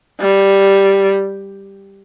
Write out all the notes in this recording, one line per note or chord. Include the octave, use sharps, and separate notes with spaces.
G3